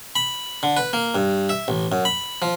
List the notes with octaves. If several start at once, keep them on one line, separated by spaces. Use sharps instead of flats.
B5
D3
B4
A#3
G2
E5
A1
F#2
B5
F3